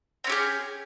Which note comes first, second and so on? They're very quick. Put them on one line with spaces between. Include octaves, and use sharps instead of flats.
C4 C#4 G4 G#4